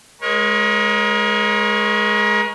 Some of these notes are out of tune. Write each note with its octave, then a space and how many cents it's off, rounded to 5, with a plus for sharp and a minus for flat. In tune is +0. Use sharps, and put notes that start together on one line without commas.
G#3 +10 A#4 +35 C#5 -20